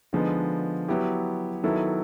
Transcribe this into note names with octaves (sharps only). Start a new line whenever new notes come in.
D3 F3 G#3 B3 D#4
F#3 B3 E4 G4
D#3 F#3 B3 E4 A4